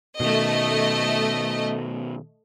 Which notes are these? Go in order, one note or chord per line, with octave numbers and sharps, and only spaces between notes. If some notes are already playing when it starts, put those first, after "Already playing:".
B2 D#3 A3 D#5